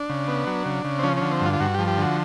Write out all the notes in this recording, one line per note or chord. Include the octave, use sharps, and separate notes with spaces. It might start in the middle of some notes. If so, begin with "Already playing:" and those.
Already playing: D4
C#3
B3
F#3
C#3
C#3
C4
F3 C#4
D3 C#4
C4
G2 F4
F4
G2 F#4
G4
F3
G4
D3
F#4